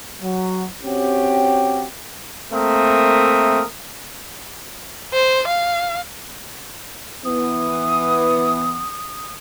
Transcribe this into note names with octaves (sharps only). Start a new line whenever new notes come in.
F#3
C4 C#4 F#4 G4
A3 A#3 C4 A#4 E5 D#6
C5
F5
E3 B3 D#6